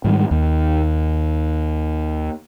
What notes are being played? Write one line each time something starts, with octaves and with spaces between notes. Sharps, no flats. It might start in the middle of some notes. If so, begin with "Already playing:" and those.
G#2 D#3 G3
D#2